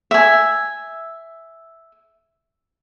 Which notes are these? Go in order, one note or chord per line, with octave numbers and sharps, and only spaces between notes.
E5 G#5